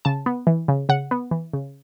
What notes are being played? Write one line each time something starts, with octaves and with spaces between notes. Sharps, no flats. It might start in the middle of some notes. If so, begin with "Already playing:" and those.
C#3 A5
B3
E3
C#3
C#3 F#5
B3
E3
C#3